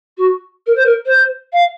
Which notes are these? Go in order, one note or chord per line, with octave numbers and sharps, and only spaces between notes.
F#4
A#4
C5
A#4
C5
F5